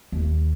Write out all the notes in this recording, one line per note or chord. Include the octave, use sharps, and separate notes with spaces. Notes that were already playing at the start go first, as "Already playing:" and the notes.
D#2